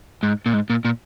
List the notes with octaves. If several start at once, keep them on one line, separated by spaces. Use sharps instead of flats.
G#2
A#2
G#2
A#2
A#2